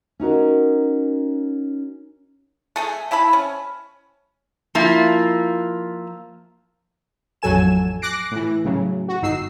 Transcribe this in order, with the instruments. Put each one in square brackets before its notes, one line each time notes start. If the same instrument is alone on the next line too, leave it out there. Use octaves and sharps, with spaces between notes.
[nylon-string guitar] C#4 D#4 F#4 A#4
[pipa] A3 G#4 A4
C3 E4 A5 B5
C#4
[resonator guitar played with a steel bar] F3 A#3 E4 F4
[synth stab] A1 F2 F#3 A4 G#5 E7
D6 F#6 A#6 C7 D7
A2 E3
A2 C#3 F#3
F#4
G1 D#4 E6 C7